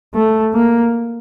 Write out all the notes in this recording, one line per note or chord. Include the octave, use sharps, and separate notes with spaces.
A3
A#3